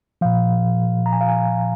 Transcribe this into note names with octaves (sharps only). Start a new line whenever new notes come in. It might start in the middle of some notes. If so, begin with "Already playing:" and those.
A#2 F3 F5
A#5
G#5
F5
G#5